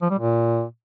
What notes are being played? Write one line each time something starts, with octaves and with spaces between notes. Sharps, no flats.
F3
G3
A#2